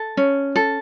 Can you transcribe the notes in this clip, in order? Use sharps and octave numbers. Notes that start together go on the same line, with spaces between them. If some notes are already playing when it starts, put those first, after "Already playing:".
Already playing: A4
C#4
A4